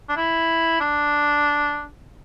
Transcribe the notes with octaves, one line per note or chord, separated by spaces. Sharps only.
D4
E4
D4